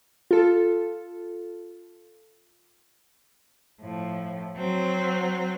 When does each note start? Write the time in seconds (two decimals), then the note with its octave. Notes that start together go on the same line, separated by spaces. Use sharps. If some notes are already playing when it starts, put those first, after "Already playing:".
0.31 F4 A4
3.81 A2 F3
4.57 F#3 C4